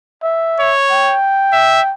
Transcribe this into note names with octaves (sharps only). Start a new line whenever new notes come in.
E5
C#5
G5
E5